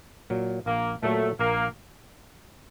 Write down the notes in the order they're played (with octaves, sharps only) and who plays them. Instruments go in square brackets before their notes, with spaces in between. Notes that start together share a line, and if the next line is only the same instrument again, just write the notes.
[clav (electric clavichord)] A#2 F#3
[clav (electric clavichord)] A#1 [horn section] A#3
[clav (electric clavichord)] A#2 F#3 [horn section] A3
[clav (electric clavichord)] A#1 [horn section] A#3